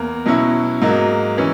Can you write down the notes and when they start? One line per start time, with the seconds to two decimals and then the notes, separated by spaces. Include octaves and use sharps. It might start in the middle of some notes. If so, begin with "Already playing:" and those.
Already playing: E2 A#3
0.26 B2 F#3 C#4 E4
0.81 G#2 F#3 A#3 D#4
1.38 E3 C#4